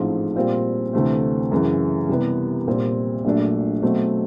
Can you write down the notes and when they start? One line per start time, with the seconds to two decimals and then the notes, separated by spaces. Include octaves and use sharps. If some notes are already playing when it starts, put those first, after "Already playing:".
Already playing: A1 G#2 F3 A3 C4
0.36 A#2 G3 C4 F4
0.93 D2 C3 E3 A3 C4
1.52 F#2 C#3 E3
2.09 C3 E3 G3 B3
2.67 A#1 A#2 G3 C4
3.24 A#1 A#2 F#3 A3 D4
3.82 B2 F#3 A3 C4